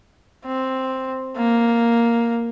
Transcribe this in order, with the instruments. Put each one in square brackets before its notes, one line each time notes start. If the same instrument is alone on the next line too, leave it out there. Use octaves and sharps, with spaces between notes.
[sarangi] C4
A#3